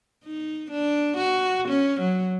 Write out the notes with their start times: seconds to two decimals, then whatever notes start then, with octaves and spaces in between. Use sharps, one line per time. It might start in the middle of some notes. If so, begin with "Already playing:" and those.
0.25 D#4
0.71 D4
1.18 F#4
1.69 C#4
2.01 F#3